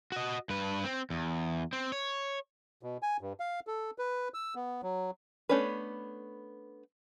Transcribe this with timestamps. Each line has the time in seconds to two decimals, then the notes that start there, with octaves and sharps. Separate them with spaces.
0.12 F#4 D#5
0.50 G2 B4
0.84 C4
1.10 E2
1.73 C4
1.92 C#5
2.83 B2
3.02 G#5
3.21 G2
3.40 F5
3.67 A4
3.98 B4
4.34 E6
4.55 B3
4.83 F#3
5.49 A3 B3 C#4 D4 B4